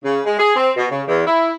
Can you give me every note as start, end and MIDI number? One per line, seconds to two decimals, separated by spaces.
0.04 0.20 49
0.26 0.39 56
0.39 0.54 68
0.56 0.71 60
0.76 0.86 47
0.91 1.02 49
1.07 1.25 40
1.27 1.51 64